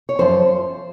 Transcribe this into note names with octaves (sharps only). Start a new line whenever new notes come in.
C#5
F#2 F3 C5